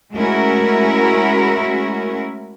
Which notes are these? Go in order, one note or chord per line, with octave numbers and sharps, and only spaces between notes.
G#3 A3 C#4 E4 F#4 A#4